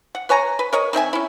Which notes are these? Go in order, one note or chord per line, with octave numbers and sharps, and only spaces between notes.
F#5
B4 C#5 G#5 A#5
B4
A#4 C#5 D#5
D#3 C4 E5 G#5
C#4 E4